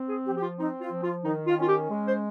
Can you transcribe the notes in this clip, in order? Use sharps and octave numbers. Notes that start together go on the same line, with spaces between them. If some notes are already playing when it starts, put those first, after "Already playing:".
Already playing: C4
G#4
F3 G4
G4
F4
C4 D#4
F4
F3
F4
D#3 D#4
F4
C#4 F4
G4
G#3
C5